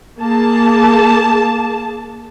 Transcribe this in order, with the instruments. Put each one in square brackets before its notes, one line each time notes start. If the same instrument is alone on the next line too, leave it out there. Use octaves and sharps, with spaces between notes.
[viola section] A#3 G#4 A5